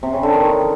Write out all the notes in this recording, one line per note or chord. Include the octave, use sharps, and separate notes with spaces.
C3
C#3
D3
D#3